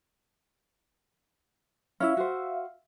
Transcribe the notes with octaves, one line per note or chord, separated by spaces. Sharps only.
C#4 E4 E5 F5
F#4 C5